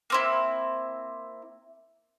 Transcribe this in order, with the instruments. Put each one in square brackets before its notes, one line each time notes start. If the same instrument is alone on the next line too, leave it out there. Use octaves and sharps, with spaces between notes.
[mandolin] A#3 C4 E4